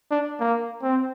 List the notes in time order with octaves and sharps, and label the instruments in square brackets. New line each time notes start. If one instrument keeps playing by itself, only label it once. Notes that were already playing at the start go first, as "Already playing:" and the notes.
[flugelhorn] D4
A#3
C4